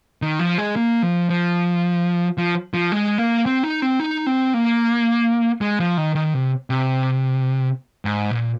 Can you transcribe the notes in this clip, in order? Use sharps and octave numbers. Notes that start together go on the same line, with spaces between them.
D#3
F3
G#3
A#3
F3
F3
F3
F3
G#3
A#3
C4
D#4
C4
D#4
C4
A#3
G#3
F3
D#3
D#3
C3
C3
G#2
A#2